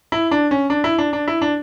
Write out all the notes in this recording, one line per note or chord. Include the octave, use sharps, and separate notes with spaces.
E4
D4
C#4
D4
E4
D4
D4
E4
D4